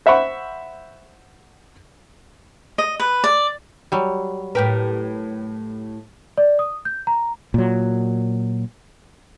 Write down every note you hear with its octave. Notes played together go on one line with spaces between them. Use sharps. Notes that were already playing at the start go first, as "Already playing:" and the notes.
C5 E5 F#5 B5 C#6
D#5
B4
D5
F#3 G3
A2 G4 A#4 B4
D5
D#6
G6
A#5
A#2 F#3